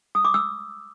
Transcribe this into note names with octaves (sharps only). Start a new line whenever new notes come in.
D#6
D6
E6